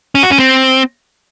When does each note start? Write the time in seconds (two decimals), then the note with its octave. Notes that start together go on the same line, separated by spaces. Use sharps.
0.15 C#4
0.23 F#4
0.31 C#4
0.39 C4